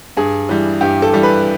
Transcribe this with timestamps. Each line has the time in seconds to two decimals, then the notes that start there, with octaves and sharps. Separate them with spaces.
0.17 G2 G#4
0.49 E3 G3
0.81 G2 G4
1.02 A4
1.13 E3 G3
1.23 B4